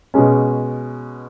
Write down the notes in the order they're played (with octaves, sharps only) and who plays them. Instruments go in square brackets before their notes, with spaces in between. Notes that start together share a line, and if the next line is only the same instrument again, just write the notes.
[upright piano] B2 G#3 C#4